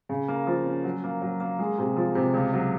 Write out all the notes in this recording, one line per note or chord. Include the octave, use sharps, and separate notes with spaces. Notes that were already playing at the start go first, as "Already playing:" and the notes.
C#3
A#3
F3
C#4
F#3
A#3
F#3
A#3
G#3
C3
F3
C3
C#2
F#3